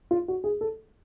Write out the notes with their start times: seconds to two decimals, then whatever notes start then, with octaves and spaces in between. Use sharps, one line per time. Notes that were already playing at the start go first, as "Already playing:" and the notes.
0.11 F4
0.28 F#4
0.44 G#4
0.61 A4